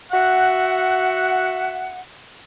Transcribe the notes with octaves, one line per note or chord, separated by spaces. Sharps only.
F#4 E5 F#5